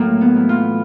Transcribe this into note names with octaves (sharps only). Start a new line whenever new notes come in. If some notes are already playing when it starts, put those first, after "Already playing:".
Already playing: A2 F#3 A#3
B3
E3
F4